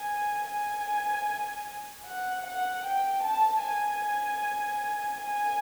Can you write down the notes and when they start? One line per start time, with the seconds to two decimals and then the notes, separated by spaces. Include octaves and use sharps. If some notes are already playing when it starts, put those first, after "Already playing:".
Already playing: G#5
0.49 G#5
2.06 F#5
2.45 F#5
2.84 G5
3.23 A5
3.62 G#5
5.20 G#5